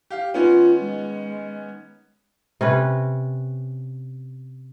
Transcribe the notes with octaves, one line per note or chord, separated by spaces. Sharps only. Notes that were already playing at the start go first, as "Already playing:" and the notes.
G4 F5
D#3 B3 C#4 F4
G#3
C3 C#4 B4